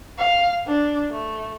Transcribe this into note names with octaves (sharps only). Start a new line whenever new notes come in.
F5
D4
A3